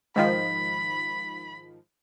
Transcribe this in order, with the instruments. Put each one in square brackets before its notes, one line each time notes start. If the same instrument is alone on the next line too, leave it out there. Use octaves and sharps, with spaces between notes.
[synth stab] G#2 D#3 F3 [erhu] B5